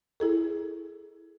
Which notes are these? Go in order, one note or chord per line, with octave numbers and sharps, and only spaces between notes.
E4 G#4 A4